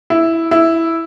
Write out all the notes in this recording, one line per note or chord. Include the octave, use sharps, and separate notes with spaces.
E4
E4